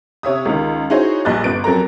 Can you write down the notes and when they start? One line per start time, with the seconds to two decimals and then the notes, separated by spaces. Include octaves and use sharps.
0.23 C3 C#5 E5 D#6
0.45 C#2 D#3
0.90 D#4 E4 F#4 G#4 C5 C#5
1.25 A#1 G3 D#5 G#5 F#6 A6
1.44 G1 B3 D7
1.64 F2 F#3 A4 A#4 A#5